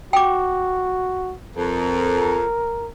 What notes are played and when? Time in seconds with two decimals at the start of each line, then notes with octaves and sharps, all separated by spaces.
0.13 F#4 G5 D6
1.55 F2 A#4